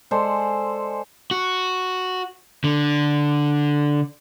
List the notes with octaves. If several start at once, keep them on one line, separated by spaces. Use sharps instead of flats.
G#3 A4 C5 D5
F#4
D3